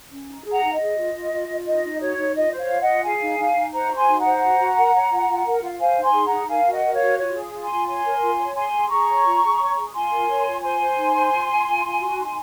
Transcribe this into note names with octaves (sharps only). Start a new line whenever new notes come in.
C#4
D#4
G#4
F#5 A#5
D#4
D#5
G#4
F4
F4
F4
F4
D#4 D#5
D#4
F#4 C#5
D#4
F4 D#5
C5
C#5 F5
F4
D#5 F#5
F4
G#4 F5 G#5
D#4
D#4
D#4
C5 F#5 A#5
F#4
G#5 C6
D#4
F#5 A#5
C5
F#4
F#4
A#4
C#5
F4
F4
A#4
F4
C5 F5 G#5
D#4
G#5 C6
G#4
F#5 A#5
D#4
A#4 F5 G#5
F#4
D#5 F#5
A#4
C#5 F5
F#4
F4 C#5
G#4
F4
G#5 C6
F4
C#5 G#5 C6
A#4
F4
C#5
G#4 G#5 C6
G#4
G#4 A#5 C#6
C#5
F4
G#4
C#5
G#4
F4 G#5 C6
A#4
C#5
F4
C5 G#5 C6
C5
D#4
C5
F4
F4
F4
F4
F#4
D#4